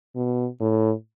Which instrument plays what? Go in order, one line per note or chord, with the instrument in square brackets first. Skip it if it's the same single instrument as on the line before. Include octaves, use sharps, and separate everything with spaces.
[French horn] B2
A2